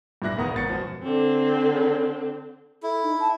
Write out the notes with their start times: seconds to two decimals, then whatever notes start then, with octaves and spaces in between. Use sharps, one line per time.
0.22 G2 A#2 E4 F#6 A#6
0.37 E1 D#3 B3 A#4 D#6 A#6
0.53 G#1 B3 A6 C#7
0.69 F#2 B2 F3
1.03 D3 C4
2.83 E4 A4
3.03 D#4
3.20 A5